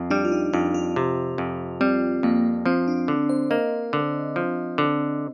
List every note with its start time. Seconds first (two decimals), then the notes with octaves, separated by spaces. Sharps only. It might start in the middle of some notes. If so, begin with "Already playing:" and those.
Already playing: F2 C4
0.10 G3 D4
0.25 F4
0.32 D#4
0.53 F2 F4
0.74 F4
0.96 C3
1.38 F2
1.81 G3 C4
2.23 F2 A#3
2.66 F3 C4
2.88 D4
3.08 D3
3.29 C5
3.50 A#3 D#5
3.93 D3
4.36 F3
4.78 D3